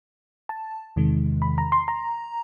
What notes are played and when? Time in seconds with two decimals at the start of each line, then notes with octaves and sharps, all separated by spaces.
0.49 A5
0.96 E2 C3 D#3 G#3
1.42 B5
1.58 A#5
1.72 C6
1.88 A#5